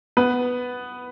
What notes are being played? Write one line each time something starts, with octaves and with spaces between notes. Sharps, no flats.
B3 B4